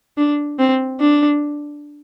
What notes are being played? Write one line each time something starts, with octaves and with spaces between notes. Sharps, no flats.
D4
C4
D4